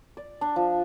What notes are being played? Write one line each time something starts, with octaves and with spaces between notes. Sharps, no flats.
D5
D4
F3